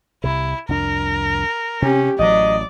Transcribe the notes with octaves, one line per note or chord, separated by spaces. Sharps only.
C2 C3 E4
C2 F2 D4 A#4
C3 C#4 G4
A1 F#3 D5 D#5